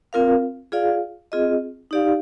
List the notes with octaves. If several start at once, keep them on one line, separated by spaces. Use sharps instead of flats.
C4 F4 A#4 F5
F4 G#4 D5 F5
C4 F4 G#4 D#5
D#4 G4 D5 F5